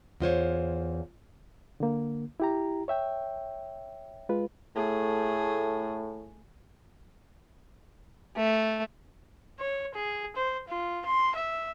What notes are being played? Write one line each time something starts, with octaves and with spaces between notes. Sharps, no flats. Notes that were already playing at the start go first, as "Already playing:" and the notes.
E2 F4 C5 C#5
D3 A#3
E4 G4 A#5
C#5 E5 G5
G#3 F4 B4
A2 A3 G#4
A3
C#5
G#4
C5
F4
C6
E5